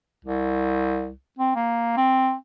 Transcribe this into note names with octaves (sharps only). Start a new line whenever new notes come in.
C2
C4
A#3
C4